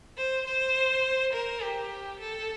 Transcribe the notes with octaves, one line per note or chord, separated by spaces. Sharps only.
C5
C5
A#4
G4
A4